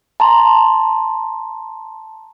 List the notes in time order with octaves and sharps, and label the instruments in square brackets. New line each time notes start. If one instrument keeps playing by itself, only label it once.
[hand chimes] A5 A#5 C6